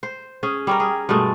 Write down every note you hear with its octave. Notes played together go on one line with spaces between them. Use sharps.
C5
C#4 G#4
G3 C#4 A#4
G#4
G2 B2 G#3 A3